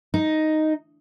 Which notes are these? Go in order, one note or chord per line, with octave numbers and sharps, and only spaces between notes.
D#4